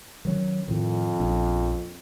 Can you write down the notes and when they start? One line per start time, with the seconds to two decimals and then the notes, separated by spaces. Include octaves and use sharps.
0.25 D#3 F#3 C#4
0.68 F2 A2 D#3
1.19 A#1 C#4